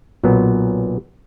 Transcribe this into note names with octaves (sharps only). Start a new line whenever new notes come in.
B1 A#2 F#3 B3